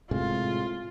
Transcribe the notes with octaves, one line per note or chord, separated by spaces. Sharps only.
A2 C3 G#3 F4